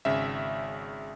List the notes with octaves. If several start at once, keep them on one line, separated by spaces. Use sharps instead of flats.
G#1 C#3 E5